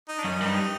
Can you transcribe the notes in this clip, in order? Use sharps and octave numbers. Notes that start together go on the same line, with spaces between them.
D#4
D4
F#2 C#4
G2 D#4